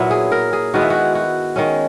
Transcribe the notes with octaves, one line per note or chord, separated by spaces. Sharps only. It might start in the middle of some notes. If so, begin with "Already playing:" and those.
Already playing: A#2 F#3 B3 E4
G#4
A#4
G#4
D#3 G#3 B3 F#4
E4
F#4
F#4
D#3 G#3 C#4